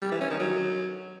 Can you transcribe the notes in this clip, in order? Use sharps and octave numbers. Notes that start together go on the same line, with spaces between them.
G3
E3
C#4
D#3
F#3